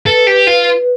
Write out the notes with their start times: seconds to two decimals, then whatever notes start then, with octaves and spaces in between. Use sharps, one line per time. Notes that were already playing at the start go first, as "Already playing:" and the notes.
0.06 A4 B4
0.27 G4
0.47 F4
0.68 B4